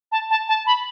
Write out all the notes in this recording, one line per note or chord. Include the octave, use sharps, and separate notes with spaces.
A5
A5
A5
B5